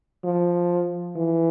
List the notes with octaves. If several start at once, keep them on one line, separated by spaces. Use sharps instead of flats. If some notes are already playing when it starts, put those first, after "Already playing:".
F3
E3